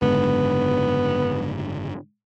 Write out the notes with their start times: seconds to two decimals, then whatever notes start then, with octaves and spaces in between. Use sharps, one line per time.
0.02 F#1 G#2 D3 B3